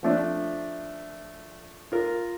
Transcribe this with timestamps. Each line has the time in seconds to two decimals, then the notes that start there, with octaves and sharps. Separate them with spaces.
0.03 F3 A3 D4
1.92 F4 A#4